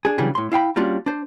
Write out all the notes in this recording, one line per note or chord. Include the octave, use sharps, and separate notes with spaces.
D4 G#4
C#3 E3 F#3 G3 D4 G#4
A2 C6
E4 F5 G5 B5
G3 A#3 C#4 D4 F4 F#4
D4 C5